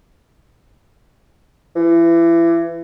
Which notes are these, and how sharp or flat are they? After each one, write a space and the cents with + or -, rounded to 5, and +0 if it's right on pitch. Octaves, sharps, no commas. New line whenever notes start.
E3 +30